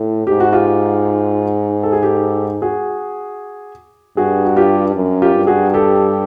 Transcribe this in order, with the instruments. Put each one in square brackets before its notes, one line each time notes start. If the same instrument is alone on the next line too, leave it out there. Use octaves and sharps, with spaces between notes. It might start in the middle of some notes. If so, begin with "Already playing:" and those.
Already playing: [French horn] A2
[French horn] G#2 [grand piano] G4
[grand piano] F#4
F4 G4
A4
G#4
G4 A4
F#4 G#4
[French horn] G2 [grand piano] F#4 G#4
[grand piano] F#4
F4 G4
[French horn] F#2
[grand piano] F4 G4
[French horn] G2
[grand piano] F#4 G#4
G4 A4